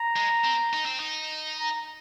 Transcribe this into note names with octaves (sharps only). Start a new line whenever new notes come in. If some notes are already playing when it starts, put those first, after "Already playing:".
Already playing: A#5
G#3
C4
D#4
C4
D#4
A#5